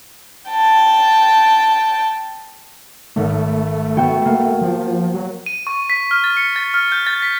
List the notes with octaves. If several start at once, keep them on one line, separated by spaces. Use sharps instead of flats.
G5 A5
G#1 A3
B3 F#4 G5
A#3
F3
F#3
D#7
C#6
B6
F6
A6
C#7
A6
F6
G6
A6
B6